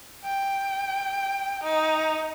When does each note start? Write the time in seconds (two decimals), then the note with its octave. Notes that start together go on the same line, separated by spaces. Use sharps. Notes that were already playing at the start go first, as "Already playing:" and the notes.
0.24 G5
1.63 D#4